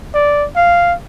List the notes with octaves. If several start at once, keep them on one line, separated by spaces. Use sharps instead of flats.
D5
F5